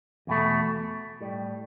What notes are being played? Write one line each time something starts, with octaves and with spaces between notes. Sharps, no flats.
E2 B2 A3
A2 G3